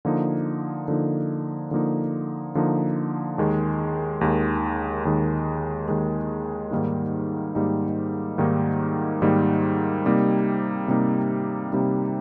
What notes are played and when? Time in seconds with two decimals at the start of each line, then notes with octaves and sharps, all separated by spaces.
0.05 D3 F3 A#3 D#4
0.88 D3 F3 A#3 D#4
1.71 D3 F3 A#3 D#4
2.55 D3 F3 A#3 D#4
3.38 D#2 D#3 G#3
4.21 D#2 D#3 G#3
5.05 D#2 D#3 G#3
5.88 D#2 D#3 G#3
6.71 G#2 D#3 G3 A#3 D#4
7.55 G#2 D#3 G3 A#3 D#4
8.38 G#2 D#3 G3 A#3 D#4
9.22 G#2 D#3 G3 A#3 D#4
10.05 C3 G3 A#3 D#4
10.88 C3 G3 A#3 D#4
11.72 C3 G3 A#3 D#4